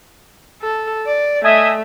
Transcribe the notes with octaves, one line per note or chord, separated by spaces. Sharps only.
A4
D5
A3 D#5 E5 G#5